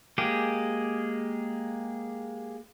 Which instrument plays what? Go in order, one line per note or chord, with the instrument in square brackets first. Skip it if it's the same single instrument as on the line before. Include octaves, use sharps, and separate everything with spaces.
[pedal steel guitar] G#3 A#3 G4 G#4